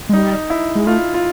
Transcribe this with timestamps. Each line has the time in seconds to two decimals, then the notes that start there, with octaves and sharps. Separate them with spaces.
0.09 G#3
0.13 G3 D#4
0.50 E4
0.75 G#3
0.87 A3 F4
1.14 F4